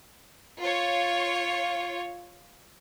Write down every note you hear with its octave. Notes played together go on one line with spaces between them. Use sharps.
F4 C#5